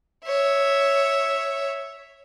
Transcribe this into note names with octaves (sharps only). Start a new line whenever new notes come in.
C#5 E5